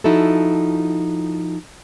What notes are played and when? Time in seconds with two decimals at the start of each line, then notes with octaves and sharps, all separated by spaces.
0.04 F3 D#4 E4 F#4 A4